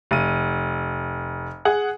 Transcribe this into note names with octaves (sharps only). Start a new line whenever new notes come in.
F1 D#7
G#4 F#5